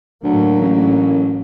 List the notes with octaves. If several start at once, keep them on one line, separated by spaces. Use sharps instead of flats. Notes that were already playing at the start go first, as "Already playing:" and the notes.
D2 A2 F#3 A#3
A1